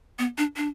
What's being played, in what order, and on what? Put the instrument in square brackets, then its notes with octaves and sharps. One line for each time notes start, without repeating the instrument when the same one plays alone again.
[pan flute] B3
D4
D4